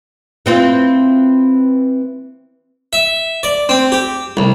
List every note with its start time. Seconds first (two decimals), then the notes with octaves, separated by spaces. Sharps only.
0.46 E3 C4 F4
2.93 E5
3.43 D5
3.69 C4
3.92 G4
4.37 C2